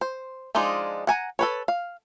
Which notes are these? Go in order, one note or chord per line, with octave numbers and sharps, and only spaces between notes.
C5
F3 G#3 D4 D#4 F4
F#5 G#5 A#5
A4 B4 C#5
F5